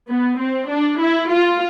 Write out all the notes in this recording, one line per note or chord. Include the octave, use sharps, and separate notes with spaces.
B3
C4
D4
E4
F4